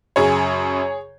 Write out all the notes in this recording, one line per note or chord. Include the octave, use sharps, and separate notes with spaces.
F#2 C#3 G#4 C#5